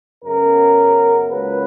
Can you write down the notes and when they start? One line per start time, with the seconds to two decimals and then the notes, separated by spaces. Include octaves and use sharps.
0.25 F#2 C#3 F#3 B3 A#4
1.28 C#2 C#3 F#3 A#3 B4